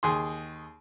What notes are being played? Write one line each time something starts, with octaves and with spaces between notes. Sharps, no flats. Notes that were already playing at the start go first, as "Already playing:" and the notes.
D#2 G#4 C6